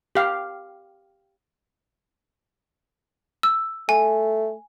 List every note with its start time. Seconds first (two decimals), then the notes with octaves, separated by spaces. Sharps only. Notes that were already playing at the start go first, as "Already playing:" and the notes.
0.15 G4 F5
3.43 E6
3.89 A3 G#5